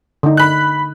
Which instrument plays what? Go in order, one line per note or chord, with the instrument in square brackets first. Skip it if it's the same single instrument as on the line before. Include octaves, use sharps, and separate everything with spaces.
[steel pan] D3 D#4
[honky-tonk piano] B5 F#6